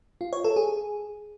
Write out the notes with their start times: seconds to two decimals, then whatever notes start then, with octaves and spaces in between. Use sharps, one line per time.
0.21 F4
0.33 C#5
0.44 A4
0.56 G#4